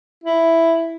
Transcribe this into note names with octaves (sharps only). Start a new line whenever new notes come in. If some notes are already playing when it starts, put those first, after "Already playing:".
E4